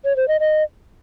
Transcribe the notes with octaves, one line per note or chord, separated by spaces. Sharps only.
C#5
C5
D#5
D#5